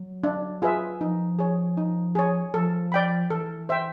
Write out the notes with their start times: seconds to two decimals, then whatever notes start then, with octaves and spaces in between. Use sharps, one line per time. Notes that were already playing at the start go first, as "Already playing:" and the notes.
Already playing: F#3
0.24 D4
0.62 F4 G#4 B4 E5
1.00 F3 D#4
1.39 G#4 C#5
1.77 D#4
2.15 G#4 C#5
2.53 F3 A4
2.92 D5 G5 B5
3.30 E3 A4
3.69 C5 E5 G5